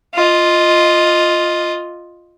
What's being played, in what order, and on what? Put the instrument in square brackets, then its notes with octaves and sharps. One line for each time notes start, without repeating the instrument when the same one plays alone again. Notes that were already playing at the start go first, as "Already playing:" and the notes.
[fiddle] F4 D#5